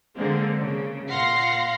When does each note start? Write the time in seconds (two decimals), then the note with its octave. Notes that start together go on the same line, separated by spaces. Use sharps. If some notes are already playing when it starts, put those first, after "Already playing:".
0.17 D3 G#3 A#3 C4
0.58 C#3
1.09 A#2 F5 F#5 C6 A#6 C7